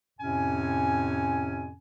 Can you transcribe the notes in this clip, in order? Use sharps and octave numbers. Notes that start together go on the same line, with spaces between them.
F2 A2 C3 C#4 G#5